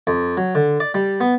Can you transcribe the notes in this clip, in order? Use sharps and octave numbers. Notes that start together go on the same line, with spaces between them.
F2
F#3
D3
D5
G3
B3